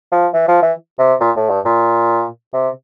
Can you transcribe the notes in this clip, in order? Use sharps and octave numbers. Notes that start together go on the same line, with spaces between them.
F3
E3
F3
E3
C3
A#2
A2
G2
A#2
C3